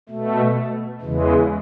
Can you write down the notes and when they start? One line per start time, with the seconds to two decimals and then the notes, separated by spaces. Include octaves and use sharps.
0.09 B2 A3
1.01 E2 C#3 E3 G#3